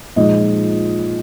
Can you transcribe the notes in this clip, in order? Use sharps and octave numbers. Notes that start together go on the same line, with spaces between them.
A#2 F3 G#3 D#4 D#5